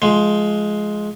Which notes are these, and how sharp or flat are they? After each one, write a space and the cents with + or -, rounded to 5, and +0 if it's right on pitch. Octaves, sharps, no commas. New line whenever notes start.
F3 +0 G#3 +15